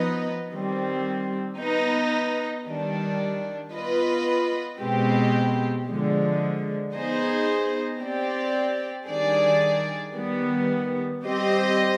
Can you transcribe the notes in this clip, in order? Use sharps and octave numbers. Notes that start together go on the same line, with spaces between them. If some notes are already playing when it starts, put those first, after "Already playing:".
Already playing: F3 B3 D#4 B4 D#5
D#3 G3 C4
B3 D#4 B4
D#3 G3 D4
B3 F4 B4 D#5
B2 G#3 C4 G4
D3 F3 G#3
B3 D#4 G#4 C5 D#5
C4 G4 D5
D#3 G3 D4 G#4 D5
D#3 G3 B3
G3 C4 G4 C5 D#5